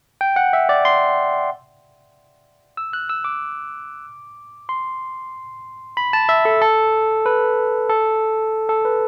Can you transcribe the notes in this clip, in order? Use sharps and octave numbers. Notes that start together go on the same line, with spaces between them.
G5
F#5
E5
D5
C6
E6
F#6
E6
D6
C6
B5
A5
E5
A4
A4
B4
A4
A4
B4